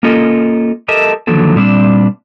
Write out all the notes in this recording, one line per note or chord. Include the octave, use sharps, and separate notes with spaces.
A#3 C#4 F4 A4 D#5
G4 A4 A#4 D#5 E5 A5
D3 D#3 F3 F#3 A#3 A4
A#2 G3 C4 D4